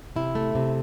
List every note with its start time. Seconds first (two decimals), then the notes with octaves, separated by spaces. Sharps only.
0.16 C3 E4
0.35 A3
0.55 C3